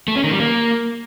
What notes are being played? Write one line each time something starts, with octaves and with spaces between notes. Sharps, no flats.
A3
C#4
D#3
G3
A#3